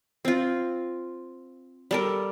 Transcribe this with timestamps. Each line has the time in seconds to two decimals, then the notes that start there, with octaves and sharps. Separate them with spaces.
0.25 C4 F4
1.91 G3 A4 A#4